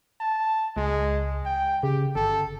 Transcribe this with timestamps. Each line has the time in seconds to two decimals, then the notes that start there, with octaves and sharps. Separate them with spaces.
0.21 A5
0.77 C#2 G#3
1.46 G5
1.83 C#3 G4
2.16 G1 A4